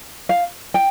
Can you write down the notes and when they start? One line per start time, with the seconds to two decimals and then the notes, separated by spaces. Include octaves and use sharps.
0.29 F5
0.74 G5